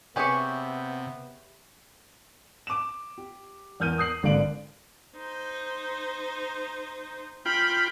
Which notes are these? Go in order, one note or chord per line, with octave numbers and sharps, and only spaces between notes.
C3 B3 C#4 G4 G#4 B4 E5 C#6
D6 E7
G4
E2 A#4 F6 G6 D#7
D#6 G6 C7 F#7
G#1 D3 D5 F5 D7 F#7
D#4 C5
F4 G5 B5